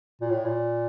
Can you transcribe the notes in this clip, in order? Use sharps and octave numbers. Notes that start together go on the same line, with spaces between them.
A#2
A2
A#2